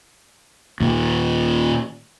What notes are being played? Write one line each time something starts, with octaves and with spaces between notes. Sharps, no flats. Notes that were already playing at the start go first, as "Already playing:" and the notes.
D#2 A#2